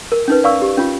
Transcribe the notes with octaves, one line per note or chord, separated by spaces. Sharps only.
A#4
C#4 D#4 B4
D5 F5 C#6 E6
G4
C#4 F4